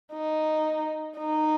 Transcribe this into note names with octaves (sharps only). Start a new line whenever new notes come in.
D#4
D#4